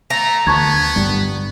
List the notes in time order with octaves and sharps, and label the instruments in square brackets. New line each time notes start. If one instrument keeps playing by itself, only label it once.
[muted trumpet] A3 [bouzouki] A#5
[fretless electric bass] D2 [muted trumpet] B3 [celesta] A5 C#6 G#6
[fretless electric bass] G1 G2 G3